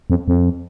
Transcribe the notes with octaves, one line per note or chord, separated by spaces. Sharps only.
F2
F2